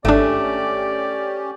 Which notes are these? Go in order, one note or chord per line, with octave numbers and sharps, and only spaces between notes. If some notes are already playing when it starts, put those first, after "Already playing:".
G#1 A3 C#4 D4 G4 D5